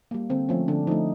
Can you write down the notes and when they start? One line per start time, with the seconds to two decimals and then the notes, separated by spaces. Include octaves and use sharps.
0.11 G3 A#3
0.30 D3 C4
0.49 F3 A3 C#4
0.68 D3 D4
0.87 F3 D#4
0.91 A3